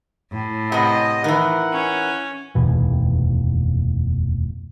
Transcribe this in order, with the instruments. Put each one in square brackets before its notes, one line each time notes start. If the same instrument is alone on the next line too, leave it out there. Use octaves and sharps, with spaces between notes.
[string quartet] A2
[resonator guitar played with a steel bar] C3 B3 [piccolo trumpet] D#5
[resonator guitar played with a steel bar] D#3 E3 [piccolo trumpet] F#5
[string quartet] C#4
[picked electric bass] F1 D#2 B2 E3